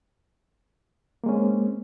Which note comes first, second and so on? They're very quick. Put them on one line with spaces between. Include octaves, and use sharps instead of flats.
A#3 G#3 C#4 C4